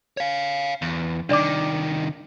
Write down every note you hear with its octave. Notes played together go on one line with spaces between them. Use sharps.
C#5 F5
E2
C2 D#3 D4 D5 D6